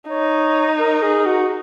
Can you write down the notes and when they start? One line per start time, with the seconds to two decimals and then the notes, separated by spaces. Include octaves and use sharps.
0.08 D#4 C#5
0.79 A#4
1.02 G#4
1.26 F#4